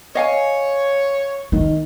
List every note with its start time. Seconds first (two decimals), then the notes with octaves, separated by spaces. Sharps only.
0.15 C#5 D#5 F5 G#5
1.52 D#3 A#3